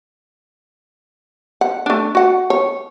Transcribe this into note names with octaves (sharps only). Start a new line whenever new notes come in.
F#5
A3 D4
F#4 F#5
C#5